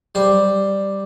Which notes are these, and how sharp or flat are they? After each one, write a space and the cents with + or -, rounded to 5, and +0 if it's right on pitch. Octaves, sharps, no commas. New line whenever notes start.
G3 +0 C5 +0